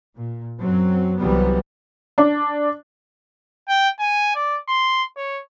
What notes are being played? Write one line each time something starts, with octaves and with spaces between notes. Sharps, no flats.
A#2
F#2 F#3 C4
C2 C3 E3 F#3 G3 B3
D4
G5
G#5
D5
C6
C#5